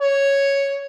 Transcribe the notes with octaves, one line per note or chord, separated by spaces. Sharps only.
C#5